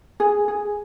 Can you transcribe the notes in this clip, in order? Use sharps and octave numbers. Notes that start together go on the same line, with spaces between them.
G#4
G#4